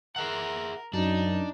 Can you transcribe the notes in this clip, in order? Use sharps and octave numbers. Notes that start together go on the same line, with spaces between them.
G#4 A#4 E5 F#5
F#2 D4 D#4